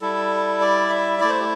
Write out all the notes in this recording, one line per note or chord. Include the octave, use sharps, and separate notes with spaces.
G3 E4 A4
D5
E5
A3 E4 D5
C5
G4